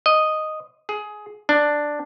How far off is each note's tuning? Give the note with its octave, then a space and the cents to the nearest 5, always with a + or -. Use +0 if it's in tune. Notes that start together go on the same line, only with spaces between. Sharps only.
D#5 -5
G#4 +15
D4 +5